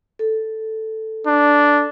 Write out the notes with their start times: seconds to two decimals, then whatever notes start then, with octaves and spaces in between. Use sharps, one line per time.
0.19 A4
1.27 D4